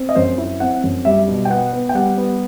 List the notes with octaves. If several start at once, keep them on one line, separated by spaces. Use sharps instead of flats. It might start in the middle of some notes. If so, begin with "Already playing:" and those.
Already playing: C4
D#5
F#2 C5
E4
C4 F#5
F#2
G3 E5
B2
G5
B3 F#5
B3
G5
G3 F#5
B3